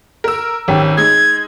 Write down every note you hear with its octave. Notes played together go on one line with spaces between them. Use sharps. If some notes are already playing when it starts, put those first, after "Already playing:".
A#4 E6
G#1 C#4 G4
G#3 D#4 G#6